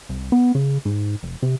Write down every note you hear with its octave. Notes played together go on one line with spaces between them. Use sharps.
C2
B3
C#3
G#2
F1
C3